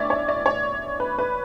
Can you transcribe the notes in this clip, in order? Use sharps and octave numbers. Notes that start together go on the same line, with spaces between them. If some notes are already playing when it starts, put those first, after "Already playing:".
Already playing: A2 E3 B3 D4 C#5 D5 E5
C#5
D5
C#5
B4
B4